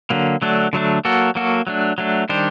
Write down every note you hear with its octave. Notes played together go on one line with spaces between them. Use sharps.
D3 F#3 A#3
D3 F#3 A3 D4
D3 F#3 A3 D4
F#3 A#3 F#4 A4
F#3 A#3 F#4 A4
F#3 A3 D4
F#3 A3 D4
D#3 G3 D4 G4 C5